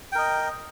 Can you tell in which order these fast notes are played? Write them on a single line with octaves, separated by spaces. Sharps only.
G5 A#4 D#5